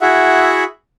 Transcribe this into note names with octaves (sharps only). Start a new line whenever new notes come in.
E4 F#4 G#4 E5 F#5